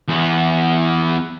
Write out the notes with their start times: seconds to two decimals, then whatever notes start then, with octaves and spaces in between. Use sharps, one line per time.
0.08 E2 B3